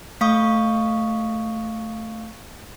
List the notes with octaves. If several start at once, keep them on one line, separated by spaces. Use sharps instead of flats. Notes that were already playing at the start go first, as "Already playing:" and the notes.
A3 F5 C#6 D#6